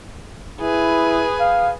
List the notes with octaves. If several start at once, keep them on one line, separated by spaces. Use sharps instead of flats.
E4 G#4 B4
F5